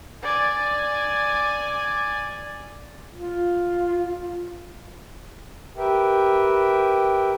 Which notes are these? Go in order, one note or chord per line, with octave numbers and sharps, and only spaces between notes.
D5 G#5
F4
G4 A#4 B4 E5 G5